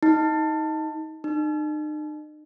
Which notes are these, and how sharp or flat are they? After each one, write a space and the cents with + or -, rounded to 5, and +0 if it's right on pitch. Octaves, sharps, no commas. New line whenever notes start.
D#4 +20
D#4 -40